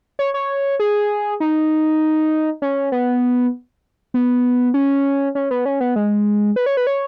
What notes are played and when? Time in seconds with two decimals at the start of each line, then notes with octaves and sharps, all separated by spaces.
0.19 C#5
0.34 C#5
0.80 G#4
1.40 D#4
2.62 C#4
2.92 B3
4.14 B3
4.74 C#4
5.35 C#4
5.51 B3
5.65 C#4
5.80 B3
5.96 G#3
6.56 B4
6.66 C#5
6.77 B4
6.87 C#5